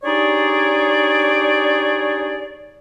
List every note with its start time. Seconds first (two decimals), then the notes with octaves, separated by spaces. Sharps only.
0.04 D4 D#4 G4 G#4 C#5 D5